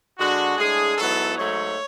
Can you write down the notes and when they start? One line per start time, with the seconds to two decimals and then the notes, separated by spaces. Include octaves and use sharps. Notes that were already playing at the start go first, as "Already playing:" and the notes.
0.18 D3 G#3 D4 F#4
0.57 A2 G#3 D4 G#4
0.97 G#2 F#3 B3 E4 A4
1.37 G#2 F#3 A3 C#5